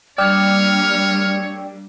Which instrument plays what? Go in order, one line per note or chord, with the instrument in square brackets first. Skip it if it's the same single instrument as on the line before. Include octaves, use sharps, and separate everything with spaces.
[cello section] G3 A#3 D4 [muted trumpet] C#5 [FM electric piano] D5 G5 E6 [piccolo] F6